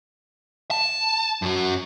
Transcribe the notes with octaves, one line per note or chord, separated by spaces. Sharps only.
A5
F#2 F#3